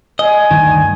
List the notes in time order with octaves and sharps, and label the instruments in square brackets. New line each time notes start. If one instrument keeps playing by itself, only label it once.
[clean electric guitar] D#5 [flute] G#5
[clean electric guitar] D2 G2 D#3